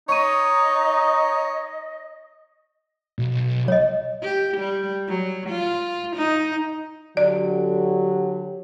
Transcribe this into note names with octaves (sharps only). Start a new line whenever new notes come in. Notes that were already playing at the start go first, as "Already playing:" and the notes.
D#4 C#5 D#5 C#6 D#7
B1
C#5 D#5
G4
G3
F#3
F4
D#4
D3 F#3 G4 D5